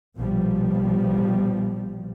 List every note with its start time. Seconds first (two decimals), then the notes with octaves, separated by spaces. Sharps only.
0.17 A#1 B2 F3 G3